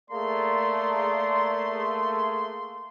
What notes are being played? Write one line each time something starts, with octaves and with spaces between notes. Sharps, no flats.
A3 A#3 G#4 D5 A#5 C6